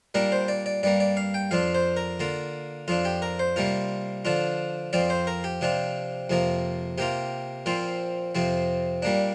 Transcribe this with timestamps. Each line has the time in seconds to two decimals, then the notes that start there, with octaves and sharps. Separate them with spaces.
0.14 A#2 G3 A#3 D4 A#4
0.32 C5
0.48 D5
0.66 D5
0.83 G2 G3 A#3 D5
1.00 D5
1.17 F5
1.34 G5
1.51 F2 F3 D4 F4 F5
1.75 C5
1.97 A#4
2.20 D3 A#3 F4
2.88 F2 F3 D4 F4
3.05 G4
3.22 A#4
3.39 C5
3.56 C3 G3 A#3 F4
4.25 D3 F3 D4 F4
4.93 F2 F3 C4 F4 D5
5.10 C5
5.27 A#4
5.44 G4
5.61 C3 F3 D4 F4
6.30 F2 C3 F3 A#3
6.98 C3 A#3 F4 G4
7.66 A#2 F3 C4 F4
8.35 F2 C3 F3 C4
9.02 A#2 G3 A#3 D4